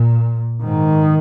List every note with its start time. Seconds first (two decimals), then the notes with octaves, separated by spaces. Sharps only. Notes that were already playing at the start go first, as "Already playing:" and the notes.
Already playing: A#2
0.63 G#2 D#3